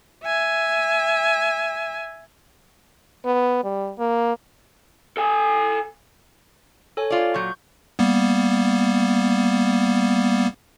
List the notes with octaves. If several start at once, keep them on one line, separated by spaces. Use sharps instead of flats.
E5 G#5
B3
G3
A#3
A4 G#5
A4 C#5 G#5
F4 D5
A#2 F#3 C#6 G6
G3 A#3 B3